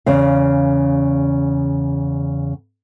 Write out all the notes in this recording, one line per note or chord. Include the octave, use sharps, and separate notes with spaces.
E2 C#3 F5